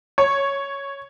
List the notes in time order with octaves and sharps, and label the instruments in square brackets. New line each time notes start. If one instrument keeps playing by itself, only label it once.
[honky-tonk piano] C#5